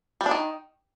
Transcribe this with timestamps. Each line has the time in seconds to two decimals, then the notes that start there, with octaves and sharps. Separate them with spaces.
0.21 G3
0.26 D4
0.31 D#3